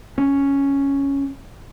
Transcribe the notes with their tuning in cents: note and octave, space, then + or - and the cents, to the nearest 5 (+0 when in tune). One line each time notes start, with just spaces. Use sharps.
C#4 +0